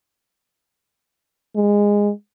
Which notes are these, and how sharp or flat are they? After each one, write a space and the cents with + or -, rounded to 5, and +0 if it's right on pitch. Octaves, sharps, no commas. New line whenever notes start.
G#3 -15